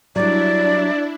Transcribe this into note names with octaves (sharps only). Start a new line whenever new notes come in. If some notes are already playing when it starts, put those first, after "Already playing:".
F#3 G3 D4 E4 D5